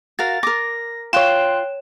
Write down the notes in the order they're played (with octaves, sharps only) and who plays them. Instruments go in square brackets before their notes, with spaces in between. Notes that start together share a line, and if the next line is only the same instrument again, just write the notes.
[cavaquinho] F#4 A#4 F5 [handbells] A6
[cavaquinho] A#4 D6 [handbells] A#6
[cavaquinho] F4 [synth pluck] C#5 E7 [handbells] G5 C6 F#6